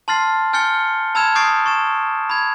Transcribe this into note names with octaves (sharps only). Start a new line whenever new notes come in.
A5 C6 F6 A6 C7
G#5 F6 G6 A6 C#7 G7
A5 B5 E6 F6 G#6 E7
C#6 D#6 G6 A6 C7 D7
C#6 A6 E7
B5 G#6